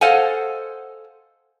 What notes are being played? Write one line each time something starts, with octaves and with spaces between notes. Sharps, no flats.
A4 C5 D#5 F5 F#5 G#5